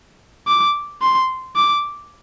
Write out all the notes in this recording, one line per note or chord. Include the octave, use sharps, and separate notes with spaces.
D6
C6
D6